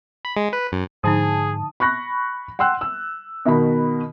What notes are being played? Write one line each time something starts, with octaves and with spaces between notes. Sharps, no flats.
B5
G#3
B4
F#2
G#2 D3 F3 D#4 G#4 A5 D#6
B5 C#6 F#6 A#6
F#5 G5 C6 E6 F#6
E6
B2 D#3 F#4 A#4 B5